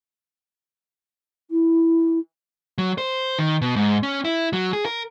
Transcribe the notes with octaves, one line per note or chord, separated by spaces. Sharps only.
E4
F#3
C5
D#3
B2
G#2
C#4
E4
F#3
G#4
A#4